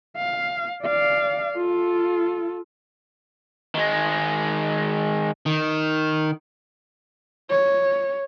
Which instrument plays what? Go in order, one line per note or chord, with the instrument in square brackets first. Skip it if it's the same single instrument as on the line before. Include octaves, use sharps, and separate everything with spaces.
[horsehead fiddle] F5
D5 F5
F4 A4
[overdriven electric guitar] D#3 G#3
[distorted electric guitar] D#3
[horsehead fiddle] C#5